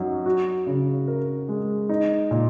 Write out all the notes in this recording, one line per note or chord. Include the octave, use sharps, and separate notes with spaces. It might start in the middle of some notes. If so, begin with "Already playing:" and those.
Already playing: F#2 F#3 D#4
F#4
C#3
A#4
G#3
D#4
A#2